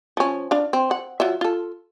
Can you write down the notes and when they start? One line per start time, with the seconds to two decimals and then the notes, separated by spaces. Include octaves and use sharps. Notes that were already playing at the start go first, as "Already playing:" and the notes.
0.17 F3 C#4
0.51 D4 F5
0.73 C4
0.91 F#5
1.20 F#3 F4 E5
1.41 F4 A4